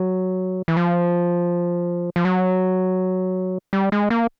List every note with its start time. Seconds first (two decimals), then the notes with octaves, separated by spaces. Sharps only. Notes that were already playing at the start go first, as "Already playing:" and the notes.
Already playing: F#3
0.68 E3
0.77 F3
2.16 F3
2.25 F#3
3.73 G3
3.92 G#3
4.10 A#3